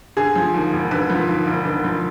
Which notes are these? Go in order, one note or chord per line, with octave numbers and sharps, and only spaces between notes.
D3 G#4
F3
D#2
E1
D3 B4
F3
D#2
E1
D3
F3